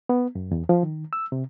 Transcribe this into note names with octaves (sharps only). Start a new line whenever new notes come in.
B3
F#2
E2
F3
D#3
E6
C3